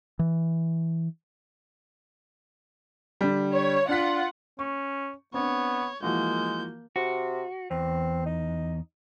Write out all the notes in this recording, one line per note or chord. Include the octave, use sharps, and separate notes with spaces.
E3
D3 G3
C#5
D4 F4 F#5 B6
C#4 C#6
B3 C4 D4 C#5
E3 F3 G#3 A#3 F#4 G6
C3 F#4
E2 C4
D#4